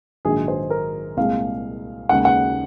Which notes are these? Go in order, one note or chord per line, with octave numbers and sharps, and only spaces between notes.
A#1 G#2 D#3 F#3 G#4
C5
A#4
C2 A#2 G#3 F5
D#2 C#3 G#3 F#5
F#5